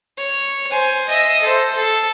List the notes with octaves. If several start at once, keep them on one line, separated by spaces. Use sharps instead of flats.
C#5
C5 G#5
D#5 E5
A4 C5
A4